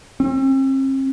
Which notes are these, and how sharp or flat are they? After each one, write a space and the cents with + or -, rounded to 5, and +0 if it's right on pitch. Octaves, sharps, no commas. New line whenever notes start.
C4 +45